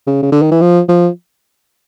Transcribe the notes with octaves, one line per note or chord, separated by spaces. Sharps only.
C#3
C#3
D3
D#3
E3
F3
F3